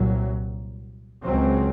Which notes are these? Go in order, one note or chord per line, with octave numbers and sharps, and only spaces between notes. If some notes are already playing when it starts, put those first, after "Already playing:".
Already playing: C2 A#2 F#3
C#2 C#3 F#3 C4